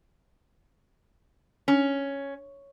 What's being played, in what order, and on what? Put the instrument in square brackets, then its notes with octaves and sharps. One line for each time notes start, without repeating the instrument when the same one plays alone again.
[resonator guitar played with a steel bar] C#4